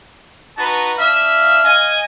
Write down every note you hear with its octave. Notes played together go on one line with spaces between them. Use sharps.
D#4 F#4 B4 A5
D4 E5 F5
D#5 G#5